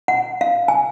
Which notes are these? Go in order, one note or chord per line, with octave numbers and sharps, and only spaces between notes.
F#5
F5
G#5